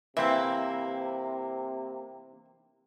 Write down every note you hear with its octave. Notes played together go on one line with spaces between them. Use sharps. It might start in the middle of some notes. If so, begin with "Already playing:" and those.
C3 E3 A#3 C4 E4 E5